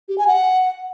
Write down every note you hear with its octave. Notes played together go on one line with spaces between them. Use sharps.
G4
G#5
F#5